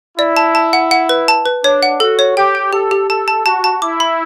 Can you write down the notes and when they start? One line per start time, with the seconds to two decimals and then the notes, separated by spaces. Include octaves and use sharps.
0.18 E4 D5
0.37 A5
0.55 A5
0.73 F#5
0.91 F#5
1.09 B4
1.28 A5
1.46 B4
1.64 D4 C#5
1.83 F#5
2.00 F#4 A4
2.19 C#5
2.37 G4 G5
2.55 G5
2.73 G4 A4
2.91 G4
3.09 A4 A5
3.28 A5
3.45 F#4 A5
3.64 A5
3.82 E4 D6
4.00 B5